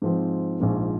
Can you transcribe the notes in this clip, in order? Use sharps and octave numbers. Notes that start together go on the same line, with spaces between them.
G#2 F3 C4
A#1 G#2 F3